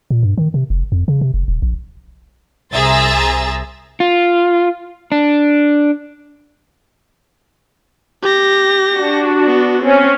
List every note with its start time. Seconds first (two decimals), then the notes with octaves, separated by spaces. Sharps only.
0.11 A#2
0.23 G2
0.38 D#3
0.54 C3
0.70 F1
0.92 F2
1.08 C#3
1.21 C3
1.34 F1
1.48 D#1
1.62 A#1
2.73 C2 G#4 C5 E5 A#5 A6
4.00 F4
5.12 D4
8.23 G4 A#6
8.93 D4 F#4
9.46 B3
9.81 C4 C#4